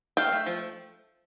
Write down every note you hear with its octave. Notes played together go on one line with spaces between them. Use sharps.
A3 F5 G5
A3
F3